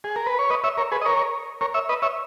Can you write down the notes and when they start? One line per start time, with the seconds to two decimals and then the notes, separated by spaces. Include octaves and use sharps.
0.04 G#4
0.16 A#4
0.27 B4
0.39 C#5
0.50 B4 D#5
0.64 C#5 E5
0.77 A#4 C#5
0.92 G#4 B4
1.01 D#5
1.05 A#4 C#5
1.61 A#4 C#5
1.74 C#5 E5
1.89 B4 D#5
2.02 C#5 E5